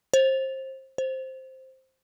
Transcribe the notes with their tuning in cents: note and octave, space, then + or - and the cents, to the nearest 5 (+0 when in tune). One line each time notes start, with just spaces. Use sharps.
C5 +25
C5 +5